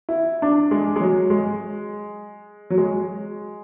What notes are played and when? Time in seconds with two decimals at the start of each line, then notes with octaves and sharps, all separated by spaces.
0.09 E4
0.42 D4
0.71 G#3
0.96 G#3
1.00 F#3
1.30 G#3
2.70 F#3
2.78 G#3